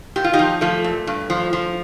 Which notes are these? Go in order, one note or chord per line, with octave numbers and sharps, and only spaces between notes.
A#2 G4
F4
D#4 G4
F3
F3 A3
A#2
G2
F3
F3